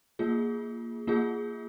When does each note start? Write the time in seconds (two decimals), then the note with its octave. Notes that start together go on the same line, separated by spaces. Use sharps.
0.19 A#3 F4 G#4
1.07 A#3 F4 G#4